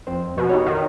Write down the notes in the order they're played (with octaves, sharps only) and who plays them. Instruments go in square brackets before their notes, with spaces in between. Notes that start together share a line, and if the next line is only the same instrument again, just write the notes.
[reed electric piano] F2 C4 C5
[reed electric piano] F2 [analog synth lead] B2
[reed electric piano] D#4 G4 C#5
[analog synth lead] D#3